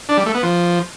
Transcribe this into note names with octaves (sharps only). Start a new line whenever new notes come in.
D4
G3
A3
B3
F3